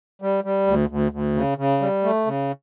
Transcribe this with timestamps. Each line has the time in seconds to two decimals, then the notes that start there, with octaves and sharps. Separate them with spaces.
0.22 G3
0.44 G3
0.67 D2
0.89 D2
1.12 D2
1.36 C#3
1.58 C#3
1.81 G3
2.03 A3
2.26 C#3